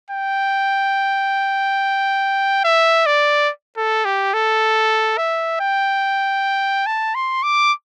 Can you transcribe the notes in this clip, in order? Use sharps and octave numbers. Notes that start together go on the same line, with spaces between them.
G5
E5
D5
A4
G4
A4
E5
G5
A5
C6
D6